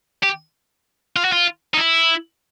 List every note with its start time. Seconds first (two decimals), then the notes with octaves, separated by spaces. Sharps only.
0.23 G4
1.16 F4
1.24 F#4
1.32 F4
1.74 D#4
1.77 E4